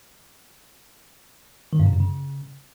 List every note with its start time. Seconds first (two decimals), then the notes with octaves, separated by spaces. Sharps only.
1.73 D#3
1.79 G2
1.86 C3
1.93 F#2
2.00 C#3